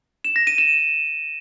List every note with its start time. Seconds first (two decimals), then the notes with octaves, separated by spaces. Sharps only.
0.25 E7
0.36 A#6
0.47 D#7
0.58 E7